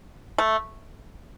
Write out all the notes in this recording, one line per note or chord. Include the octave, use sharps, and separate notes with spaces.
A3